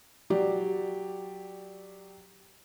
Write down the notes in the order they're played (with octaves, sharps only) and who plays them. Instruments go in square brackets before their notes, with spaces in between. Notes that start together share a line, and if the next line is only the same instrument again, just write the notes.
[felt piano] F#3 G4 D5